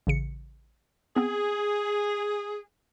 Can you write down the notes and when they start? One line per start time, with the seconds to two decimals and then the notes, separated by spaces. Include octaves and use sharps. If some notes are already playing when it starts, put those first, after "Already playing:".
0.07 A1 C#3 C#7
1.16 B3 C4 G#4